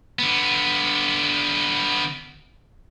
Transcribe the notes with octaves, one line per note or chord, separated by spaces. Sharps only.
D3 B3